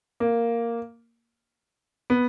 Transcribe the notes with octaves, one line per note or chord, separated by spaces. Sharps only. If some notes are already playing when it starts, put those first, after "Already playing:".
A#3
B3